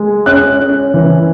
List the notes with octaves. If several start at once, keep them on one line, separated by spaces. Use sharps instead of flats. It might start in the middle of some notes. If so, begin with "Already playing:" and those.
Already playing: G#3
C#4 F#6
C#4
E3